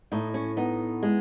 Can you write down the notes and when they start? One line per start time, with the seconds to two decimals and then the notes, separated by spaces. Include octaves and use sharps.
0.12 A2 D#4
0.34 C#4
0.57 B3 D#4
1.03 G#3